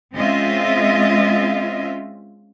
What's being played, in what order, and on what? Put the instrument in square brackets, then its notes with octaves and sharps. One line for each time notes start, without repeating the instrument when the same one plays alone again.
[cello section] G#3 C4 C#4 F4 D#5 E5